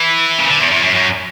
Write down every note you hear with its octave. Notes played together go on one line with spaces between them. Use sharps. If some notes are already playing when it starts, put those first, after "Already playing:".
Already playing: E3
C#3
D3
E2
E2
F#2
F#2